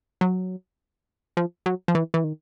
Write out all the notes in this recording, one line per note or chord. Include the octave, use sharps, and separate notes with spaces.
F#3
F3
F#3
F3
E3
E3
D#3